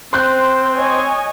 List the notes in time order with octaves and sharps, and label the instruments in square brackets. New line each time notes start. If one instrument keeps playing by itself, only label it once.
[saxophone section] C4 [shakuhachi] C5 [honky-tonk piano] C6 F#6 G6
[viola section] C#5 D#5 G#5